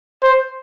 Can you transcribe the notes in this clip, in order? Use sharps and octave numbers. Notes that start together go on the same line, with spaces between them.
C5